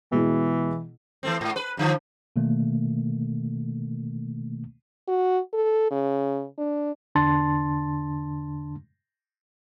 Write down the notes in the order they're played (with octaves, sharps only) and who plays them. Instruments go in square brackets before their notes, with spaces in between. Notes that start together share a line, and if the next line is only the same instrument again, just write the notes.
[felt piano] B2 G#3 E4 [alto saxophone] E3
[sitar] E3 A3 C4
G#2
B4
G2 D3 F3
[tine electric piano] B2 D#3 A3 A#3
[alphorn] F#4
A4
C#3
D4
[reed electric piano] E2 D3 D4 A5 C6 A6